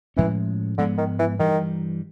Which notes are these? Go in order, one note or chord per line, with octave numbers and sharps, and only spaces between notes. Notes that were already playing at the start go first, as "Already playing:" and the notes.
A2 E3 F3 G#3 C#4
G#2 D3 F3 G#3 B3
D#3
E3
G2 D#3 E3 G3